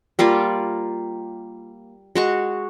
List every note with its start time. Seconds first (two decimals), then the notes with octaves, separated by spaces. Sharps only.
0.19 G3 A#3 F4 D5
2.15 G#3 F#4 C#6